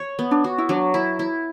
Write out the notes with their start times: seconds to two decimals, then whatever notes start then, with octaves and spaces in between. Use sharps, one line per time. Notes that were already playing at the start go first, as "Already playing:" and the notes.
Already playing: C#5
0.19 B3
0.31 D4
0.44 F#4
0.58 E4
0.69 F#3 D4
0.94 E4
1.19 E4